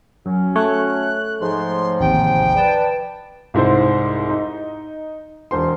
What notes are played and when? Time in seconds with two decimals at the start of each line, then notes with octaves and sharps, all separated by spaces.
0.26 F#2 F#3 C#4
0.56 A3 C#5 F#6
1.41 G#2 F3 C6
2.00 A1 D#2 C3 G5
2.56 B4 D5 A5
3.54 C2 G#2 E4 C5
4.30 D#4
5.51 E1 C5 C6